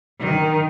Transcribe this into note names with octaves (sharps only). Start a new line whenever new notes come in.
D#3